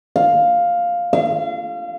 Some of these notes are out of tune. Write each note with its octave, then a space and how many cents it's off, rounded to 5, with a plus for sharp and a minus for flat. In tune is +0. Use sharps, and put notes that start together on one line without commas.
F5 +5
F5 -40